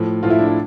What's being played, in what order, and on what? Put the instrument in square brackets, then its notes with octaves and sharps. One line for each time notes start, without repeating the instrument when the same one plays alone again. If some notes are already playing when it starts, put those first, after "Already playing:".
Already playing: [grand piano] A2 F3
A2 F3 F4
E4
D4
E4